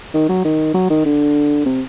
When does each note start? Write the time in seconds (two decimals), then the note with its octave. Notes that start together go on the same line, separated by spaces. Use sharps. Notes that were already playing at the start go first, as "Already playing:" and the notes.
0.14 D#3
0.29 F#3
0.45 D#3
0.75 F#3
0.90 D#3
1.06 D3
1.66 C3